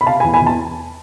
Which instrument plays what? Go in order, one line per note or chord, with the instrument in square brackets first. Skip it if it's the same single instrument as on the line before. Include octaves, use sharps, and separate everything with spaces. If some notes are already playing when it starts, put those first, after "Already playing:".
[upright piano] B5
C3 F5 A5
G#5 B5
E2
G#5 B5
E2
A5